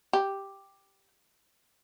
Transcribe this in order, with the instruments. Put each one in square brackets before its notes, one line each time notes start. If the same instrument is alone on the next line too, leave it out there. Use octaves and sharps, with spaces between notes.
[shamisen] G4